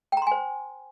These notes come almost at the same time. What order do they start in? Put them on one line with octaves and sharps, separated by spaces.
G5 A#5 C6 G#5 C5